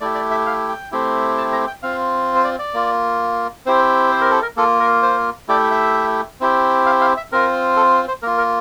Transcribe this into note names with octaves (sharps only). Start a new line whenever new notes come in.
A3 E4 G4 D5
D5
E5
F5
G5
A3 C4 E4 G4
A5
A#5
G5
C4 F4 F5
C5
D5
D5
A#3 F4
C4 E4 G4 C5
C5
A#4
A4
A#4
A#3 F4 A4
A#4
C5
A3 E4 G4 D5
E5
C4 E4 G4
F5
F5
E5
C4 F4 A#4
A4
C5
A#3 F4 A#4
A#4